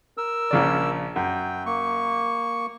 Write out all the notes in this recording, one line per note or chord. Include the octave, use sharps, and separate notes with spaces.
A#4 E6
A#1 C#3 D5
F#2 G5
A#3 C#6